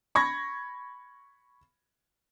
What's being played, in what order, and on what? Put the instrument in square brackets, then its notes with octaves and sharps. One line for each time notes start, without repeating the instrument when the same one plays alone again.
[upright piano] B5 C#6 G#6 A#6